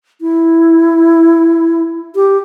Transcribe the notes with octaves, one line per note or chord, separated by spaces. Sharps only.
E4
G4